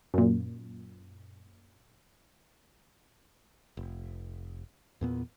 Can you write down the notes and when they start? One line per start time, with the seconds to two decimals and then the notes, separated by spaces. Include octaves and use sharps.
0.14 F#2 A#2
3.77 F1
5.01 E2 A#2 B3